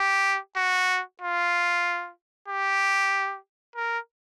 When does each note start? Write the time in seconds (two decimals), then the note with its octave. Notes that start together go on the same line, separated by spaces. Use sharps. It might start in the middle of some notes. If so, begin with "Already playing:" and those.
Already playing: G4
0.56 F#4
1.21 F4
2.48 G4
3.76 A#4